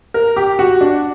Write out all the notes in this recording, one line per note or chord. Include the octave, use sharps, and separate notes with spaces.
A#4
G4
F#4
D4